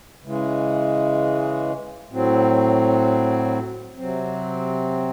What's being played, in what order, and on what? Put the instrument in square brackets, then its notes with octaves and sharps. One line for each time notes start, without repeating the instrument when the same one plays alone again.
[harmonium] C#3 E3 G#3
A2 F#3 C4
C3 F#3 C4